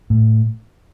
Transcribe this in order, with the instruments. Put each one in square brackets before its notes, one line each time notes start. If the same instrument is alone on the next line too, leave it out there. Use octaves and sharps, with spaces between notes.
[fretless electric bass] A2